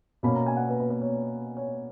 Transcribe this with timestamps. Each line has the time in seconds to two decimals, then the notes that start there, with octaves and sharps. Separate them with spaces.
0.23 B2 A#3 C#4 B5
0.35 A#5
0.46 G#5
0.57 F#5
0.69 B4
0.80 B4
0.90 B4
1.02 C#5
1.57 C#5